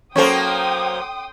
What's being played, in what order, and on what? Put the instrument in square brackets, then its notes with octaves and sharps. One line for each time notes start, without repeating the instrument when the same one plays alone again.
[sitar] F#3 A#3 C5 [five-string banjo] C#4 A4 [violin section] G5 C6 D#6